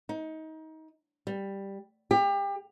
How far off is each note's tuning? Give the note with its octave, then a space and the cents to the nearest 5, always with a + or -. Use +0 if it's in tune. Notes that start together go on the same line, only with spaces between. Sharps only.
D#4 +25
G3 +5
G4 +30